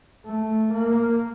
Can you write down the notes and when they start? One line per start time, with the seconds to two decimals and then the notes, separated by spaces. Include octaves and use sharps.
0.26 A3
0.74 A#3